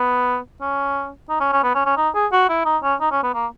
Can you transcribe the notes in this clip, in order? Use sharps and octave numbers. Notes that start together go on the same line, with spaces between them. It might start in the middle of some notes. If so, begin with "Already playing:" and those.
Already playing: B3
C#4
D#4
C#4
C#4
B3
C#4
C#4
D#4
G#4
F#4
E4
D#4
C#4
D#4
C#4
B3
A#3